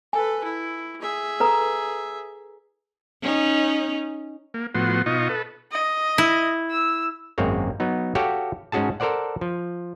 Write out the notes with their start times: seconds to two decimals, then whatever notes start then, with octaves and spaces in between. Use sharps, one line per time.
0.13 A4 B4 G#5
0.43 E4
1.01 G#4 E5
1.40 A4 B4 A#5
3.22 C#4 D#4
4.54 A#3
4.74 A2 F3 B3 F#4 C6
5.06 B2 D#4 F4 D#5 C#6
5.29 A4 B4
5.71 D#5
6.18 E4
6.70 E6
7.38 G#1 F#2 G#3 A#3 C4 C#5
7.80 F#3 B3 D#4
8.15 F#4 G4 A4 C#5 F5 G5
8.72 G#2 G#3 C#4 F#4 G#4 A5
9.00 A4 A#4 C5 D5 F#5
9.41 F3